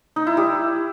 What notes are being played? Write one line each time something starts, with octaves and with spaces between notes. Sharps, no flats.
D#4
E4
G3